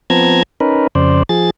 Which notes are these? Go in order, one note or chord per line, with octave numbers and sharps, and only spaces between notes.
F3 B3 C4 A5 A#5 G#6
C#4 D#4 A#4 B4
F2 C#3 C5 D5
F3 G#4 A6